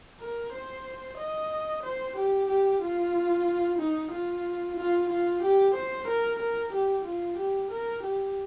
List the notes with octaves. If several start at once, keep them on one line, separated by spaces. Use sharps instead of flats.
A#4
C5
D#5
C5
G4
G4
F4
D#4
F4
F4
F4
G4
C5
A#4
A#4
G4
F4
G4
A#4
G4